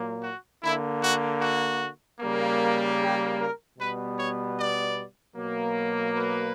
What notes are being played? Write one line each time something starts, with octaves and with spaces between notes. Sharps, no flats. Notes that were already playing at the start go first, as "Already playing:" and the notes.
Already playing: A#2 F#3 A#3
F#4
D3 A#3 E4
F#4
F#4
C#3 G3 A#3
G4
A#4
B2 G3 B3 B4
C#5
D5
B2 F#3 A#3
B4